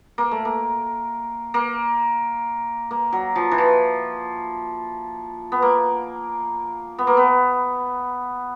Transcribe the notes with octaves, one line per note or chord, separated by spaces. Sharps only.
A#3
A3
A#3
A#3
A#3
F#3
F3
E3
F3
B3
A#3
B3
A#3
B3